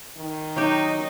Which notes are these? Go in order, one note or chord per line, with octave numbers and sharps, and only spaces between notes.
D#3
F#3 D#4 G4